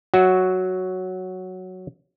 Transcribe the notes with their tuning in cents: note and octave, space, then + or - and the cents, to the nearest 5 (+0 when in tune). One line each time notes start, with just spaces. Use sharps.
F#3 +0 F#4 +0 E5 -15